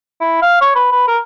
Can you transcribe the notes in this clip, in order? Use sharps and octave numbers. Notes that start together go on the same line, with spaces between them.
E4
F5
C#5
B4
B4
A#4